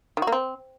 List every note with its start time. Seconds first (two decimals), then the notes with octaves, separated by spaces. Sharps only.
0.17 D#3
0.22 F#4
0.27 A#3
0.32 C4